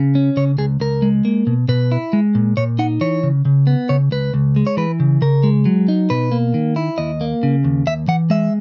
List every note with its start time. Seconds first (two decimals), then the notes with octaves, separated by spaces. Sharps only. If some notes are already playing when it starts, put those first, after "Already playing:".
Already playing: C#3
0.15 C#4
0.37 C#3 C#5
0.58 C#2 G#4
0.80 C#2 A#4
1.02 G#3
1.25 A#3
1.47 B2
1.68 B2 B4
1.92 E4
2.13 G#3
2.35 A#2
2.57 A#2 C#5
2.79 D#4 F#5
3.01 E3 C#5
3.23 C#3
3.45 C#3
3.67 B3
3.89 C#3 C#5
4.11 C#2 B4
4.34 C#2
4.56 G#3
4.67 C#5
4.77 E3 B4
5.00 C#3
5.22 C#3 A#4
5.43 G#3
5.65 F#3
5.88 D#4
6.10 B2 B4
6.32 A#3
6.54 D#3
6.76 E4
6.98 D#2 D#5
7.21 A#3
7.43 C#3
7.64 D#2
7.87 D#2 E5
8.08 E3 F#5
8.30 G#3 E5